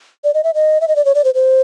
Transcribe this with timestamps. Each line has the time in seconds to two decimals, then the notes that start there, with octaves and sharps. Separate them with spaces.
0.24 D5
0.34 D#5
0.44 E5
0.54 D#5
0.81 E5
0.88 D#5
0.96 D5
1.05 C#5
1.15 D5
1.24 C5
1.35 C5